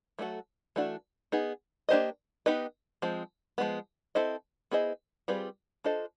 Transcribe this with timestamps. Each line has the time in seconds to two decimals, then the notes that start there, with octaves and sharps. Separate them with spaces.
0.19 F#3 A3 D4 F#4 A4
0.76 E3 A3 D4 F#4
1.32 B3 D#4 G#4
1.89 A#3 D4 G4 C5 D#5
2.46 B3 D#4 G4 B4 D#5
3.02 F3 G#3 C4
3.58 F3 G#3 B3
4.15 C4 E4 A4 C5 D#5
4.71 B3 E4 G#4 C5 D#5
5.28 G3 C4 F4 G#4 B4
5.84 D4 F4 A4 C5 D#5